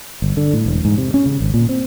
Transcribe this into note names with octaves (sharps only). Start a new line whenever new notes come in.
G1
D3
A2
E1
G#2
C3
C#4
C#3
G#1
A#2
C4